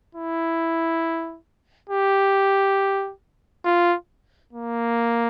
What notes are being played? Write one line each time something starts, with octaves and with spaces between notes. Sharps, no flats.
E4
G4
F4
A#3